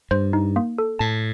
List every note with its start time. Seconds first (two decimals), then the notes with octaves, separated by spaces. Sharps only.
0.11 G2 C5
0.33 D#4
0.56 A#3
0.78 A4
0.99 A2 A5